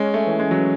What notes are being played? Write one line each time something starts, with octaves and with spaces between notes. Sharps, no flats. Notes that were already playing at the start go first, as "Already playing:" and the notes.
Already playing: G#3 C#4
A3
E3
G#3
F#3